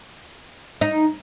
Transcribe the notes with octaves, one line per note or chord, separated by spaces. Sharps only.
D#4